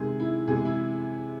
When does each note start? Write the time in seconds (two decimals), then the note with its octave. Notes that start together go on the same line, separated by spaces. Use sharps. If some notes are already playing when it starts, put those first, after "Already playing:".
Already playing: C3 D#3 G#3 G#4
0.20 E4
0.47 C3 E3 G#3 G#4
0.65 E4